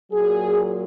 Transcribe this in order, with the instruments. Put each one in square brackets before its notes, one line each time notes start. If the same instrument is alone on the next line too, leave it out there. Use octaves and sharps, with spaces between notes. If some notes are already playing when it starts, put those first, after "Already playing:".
[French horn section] A#2 F#3 G#4